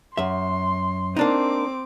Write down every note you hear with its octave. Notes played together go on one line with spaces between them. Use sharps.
F#2 E5 C6
A#3 C4 D4 D#4 D6